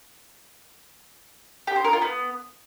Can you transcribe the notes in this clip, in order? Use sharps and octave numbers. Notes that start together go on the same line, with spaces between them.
G4
C5
A#4
F4
B3